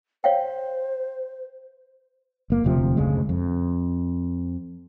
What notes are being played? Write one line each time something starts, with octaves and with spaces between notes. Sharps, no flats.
C5 C#5 F5 G5
F#1 A#3
E1 D2 C3 F3
F#1 D2 C#3 G#3
F2